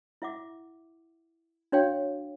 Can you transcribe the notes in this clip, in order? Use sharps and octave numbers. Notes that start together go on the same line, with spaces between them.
E4 E5 F#5 D6
D4 F#4 C#5 F5 G5